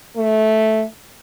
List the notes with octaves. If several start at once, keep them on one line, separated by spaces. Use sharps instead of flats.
A3